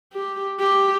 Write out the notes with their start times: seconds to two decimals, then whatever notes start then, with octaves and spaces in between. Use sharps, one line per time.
0.13 G4
0.59 G4